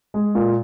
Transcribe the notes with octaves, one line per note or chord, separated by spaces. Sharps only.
G#3
A#2